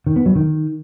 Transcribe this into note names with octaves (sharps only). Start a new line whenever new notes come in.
D#3
B3
F#3
D#3